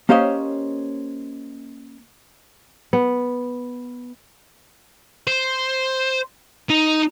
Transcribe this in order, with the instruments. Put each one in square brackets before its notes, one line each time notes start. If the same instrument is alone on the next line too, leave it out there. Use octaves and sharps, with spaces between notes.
[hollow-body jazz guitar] A#3 C#4 G4 C5 C#5 D#5
[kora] B3
[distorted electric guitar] C5
D#4